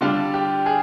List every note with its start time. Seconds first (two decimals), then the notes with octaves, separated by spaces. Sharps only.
0.01 D3 G3 D4 F4
0.34 G4
0.66 G#4